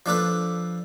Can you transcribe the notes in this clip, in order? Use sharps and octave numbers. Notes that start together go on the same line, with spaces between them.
F3 D4 A4 B4